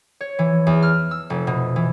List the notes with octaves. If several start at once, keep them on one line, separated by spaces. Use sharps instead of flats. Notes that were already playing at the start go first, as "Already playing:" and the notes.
C#5
E3
E2
F6
E6
F1
B2
E3